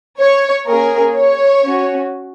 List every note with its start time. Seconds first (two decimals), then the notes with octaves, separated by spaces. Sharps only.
0.19 C#5
0.67 A#3 C#4 G#4 A#4
1.15 C#5
1.64 C#4 F#4